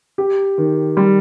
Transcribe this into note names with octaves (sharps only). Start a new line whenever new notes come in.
G4
D#3
G3